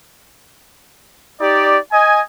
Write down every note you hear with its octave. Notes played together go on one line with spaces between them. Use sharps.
D#4 G4 D5
D#5 G#5